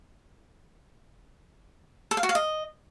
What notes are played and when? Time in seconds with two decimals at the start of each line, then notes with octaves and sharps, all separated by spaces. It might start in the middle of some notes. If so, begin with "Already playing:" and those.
2.11 A4
2.17 F5
2.23 F#4
2.29 F5
2.35 D#5